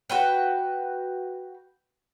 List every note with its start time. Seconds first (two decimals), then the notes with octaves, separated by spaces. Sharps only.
0.10 F#4 B4 G5